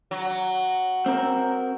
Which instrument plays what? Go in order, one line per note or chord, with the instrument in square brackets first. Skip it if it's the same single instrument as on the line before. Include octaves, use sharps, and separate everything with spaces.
[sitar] F#3
[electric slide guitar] C4 A#4